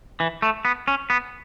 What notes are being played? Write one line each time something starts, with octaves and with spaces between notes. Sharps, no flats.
E3
A3
B3
C#4
B3